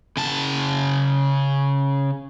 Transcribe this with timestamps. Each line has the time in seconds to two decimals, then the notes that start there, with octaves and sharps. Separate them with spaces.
0.17 C#3 A5